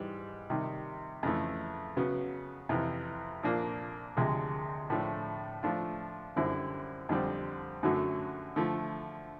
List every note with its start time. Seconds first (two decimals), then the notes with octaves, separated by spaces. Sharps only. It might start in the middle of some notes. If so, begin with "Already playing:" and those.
Already playing: G#2 E3 G3
0.50 C3 D#3 G3
1.23 F2 C#3 E3 A3
1.97 C#3 F#3 B3
2.69 F2 C3 E3
3.43 A#2 F3 A#3 D4
4.17 D2 C3 F3 G#3
4.90 A2 F3 A3 D4
5.63 F3 A3 D4 F4
6.36 F#2 D3 G3 C4 E4
7.09 F2 D3 G3 C4
7.83 F#2 D3 F#3 A3
8.56 D3 F3 A3